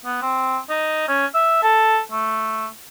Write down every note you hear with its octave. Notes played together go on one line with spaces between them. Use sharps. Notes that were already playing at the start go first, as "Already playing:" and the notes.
B3
C4
D#4
C#4
E5
A4
A3